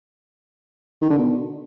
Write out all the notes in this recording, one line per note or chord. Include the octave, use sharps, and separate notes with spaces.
D#3
D3
B2